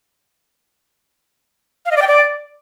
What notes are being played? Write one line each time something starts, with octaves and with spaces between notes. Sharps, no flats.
F5
D#5
D5
G5
D5